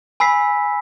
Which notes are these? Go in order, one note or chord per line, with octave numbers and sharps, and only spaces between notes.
G#5 B5 E6 B6 C7